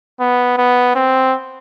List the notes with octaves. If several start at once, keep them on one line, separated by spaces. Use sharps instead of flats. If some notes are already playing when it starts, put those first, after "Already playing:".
B3
B3
C4